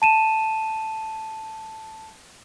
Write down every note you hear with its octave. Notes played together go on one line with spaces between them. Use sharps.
A5 D#7 E7